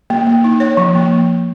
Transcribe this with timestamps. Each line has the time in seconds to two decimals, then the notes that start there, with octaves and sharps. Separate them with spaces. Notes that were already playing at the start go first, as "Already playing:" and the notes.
0.10 A#3
0.27 A#3
0.44 D#4
0.60 C#5
0.77 F3
0.95 A#3